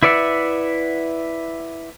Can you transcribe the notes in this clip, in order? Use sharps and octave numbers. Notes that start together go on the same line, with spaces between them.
E4 B4 D5 E5 F#5